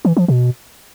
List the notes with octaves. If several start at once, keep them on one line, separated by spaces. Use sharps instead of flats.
E3
F3
B2